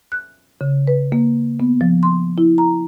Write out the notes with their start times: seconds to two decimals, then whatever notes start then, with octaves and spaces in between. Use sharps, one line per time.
0.12 F#6
0.61 C#3
0.88 B4
1.12 A#3
1.60 B3
1.81 F3
2.03 C6
2.38 E4
2.58 A#5